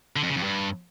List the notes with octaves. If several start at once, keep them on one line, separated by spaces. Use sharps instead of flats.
D3
F2
C#3
F2
G2